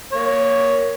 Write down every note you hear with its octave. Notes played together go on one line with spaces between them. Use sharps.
A#3 C#5